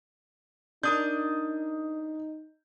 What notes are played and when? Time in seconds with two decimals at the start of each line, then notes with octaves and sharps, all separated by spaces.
0.83 D4 D#4 A#4 D#6 G6